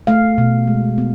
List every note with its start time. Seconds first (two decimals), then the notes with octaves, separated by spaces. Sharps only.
0.07 A3 F5
0.38 B2
0.67 G#3
0.98 B3